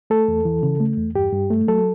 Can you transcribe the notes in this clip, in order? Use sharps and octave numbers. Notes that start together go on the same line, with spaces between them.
A3 A4
E2
E3
C#3
A3
E2
G2 G4
G2
A3
F#3 A4